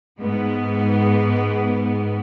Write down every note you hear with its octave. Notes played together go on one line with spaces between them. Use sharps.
G#2 B3